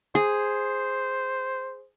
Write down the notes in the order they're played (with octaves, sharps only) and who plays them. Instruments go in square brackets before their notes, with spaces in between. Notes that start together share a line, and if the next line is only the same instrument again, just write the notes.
[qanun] G#4 [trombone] C5